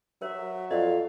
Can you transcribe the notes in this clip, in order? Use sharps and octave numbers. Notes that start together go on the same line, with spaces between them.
F#3 A#4 C5 E5
F2 C5 D5 D#5 F5